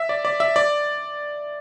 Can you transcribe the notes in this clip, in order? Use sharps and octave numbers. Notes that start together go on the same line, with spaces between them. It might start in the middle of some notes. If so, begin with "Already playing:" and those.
Already playing: E5
D5
D5
E5
D5